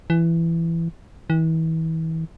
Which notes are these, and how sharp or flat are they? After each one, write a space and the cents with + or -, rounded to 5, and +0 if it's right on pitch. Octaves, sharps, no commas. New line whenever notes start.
E3 +15
E3 -35